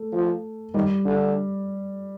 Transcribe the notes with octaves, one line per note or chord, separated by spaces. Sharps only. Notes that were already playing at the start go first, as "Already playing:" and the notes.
Already playing: A3
F3
D#3 G3
D3